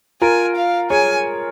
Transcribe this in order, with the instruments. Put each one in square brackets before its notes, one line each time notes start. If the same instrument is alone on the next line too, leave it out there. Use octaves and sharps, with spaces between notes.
[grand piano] F4 A#4 [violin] G#5
[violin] F5
[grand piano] G#4 C#5 [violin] G#5